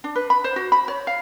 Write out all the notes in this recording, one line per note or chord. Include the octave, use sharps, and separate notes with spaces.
D4
B4
B5
C5
F#4
B5
C#5
F5